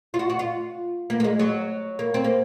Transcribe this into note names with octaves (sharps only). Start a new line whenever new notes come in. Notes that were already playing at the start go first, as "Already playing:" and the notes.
F4
F#4
F#4
F4
A#3
A#3
G#3
F#3
A#3
C4
A#3